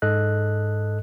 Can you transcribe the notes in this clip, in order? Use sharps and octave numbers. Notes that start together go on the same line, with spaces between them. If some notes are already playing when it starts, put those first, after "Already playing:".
G#2 A4 D#5 F#6